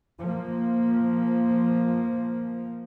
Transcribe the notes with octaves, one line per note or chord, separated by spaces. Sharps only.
F3 A#3